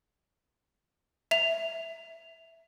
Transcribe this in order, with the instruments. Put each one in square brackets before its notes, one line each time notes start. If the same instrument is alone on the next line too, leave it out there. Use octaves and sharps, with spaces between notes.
[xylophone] E5 F7